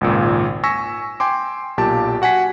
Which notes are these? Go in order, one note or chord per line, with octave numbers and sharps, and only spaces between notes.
G#1 C#2 A#2
G#5 C#6 E6 A#6 B6
G5 G#5 C6 D6
B1 A#2 G4 A5 D6
F#4 F#5 G#5 B6 C7